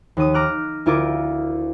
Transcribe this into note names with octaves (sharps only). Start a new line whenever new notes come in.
D#2 D#6
A#5 D6 F6 F#6
D2 E4 F4 A#4 D6